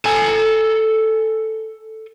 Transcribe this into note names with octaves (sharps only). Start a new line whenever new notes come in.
A4 G#5